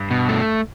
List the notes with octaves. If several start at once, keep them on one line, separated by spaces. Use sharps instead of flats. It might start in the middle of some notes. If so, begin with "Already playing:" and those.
Already playing: G2 G3
B2
A3